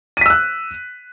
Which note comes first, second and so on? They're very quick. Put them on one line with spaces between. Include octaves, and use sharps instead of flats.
D#7 B6 E6 F#6